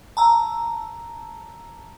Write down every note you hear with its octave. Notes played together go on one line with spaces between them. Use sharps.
A5 A#5 E6